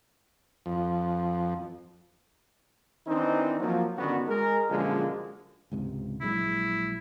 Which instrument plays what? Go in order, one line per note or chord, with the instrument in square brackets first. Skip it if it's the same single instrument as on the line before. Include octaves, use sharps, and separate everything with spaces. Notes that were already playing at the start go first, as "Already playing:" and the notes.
[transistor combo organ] F2
[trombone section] D#3 E3 C4 D4 D#4
F3 F#3 A#3
G2 D3 D#3 B3 C#4 F#4
G#3 A#4
F#2 A#2 D3 F3 G#3
[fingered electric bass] C#2 G#2 C3
[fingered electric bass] A#1 F#3 G#3 [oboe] E4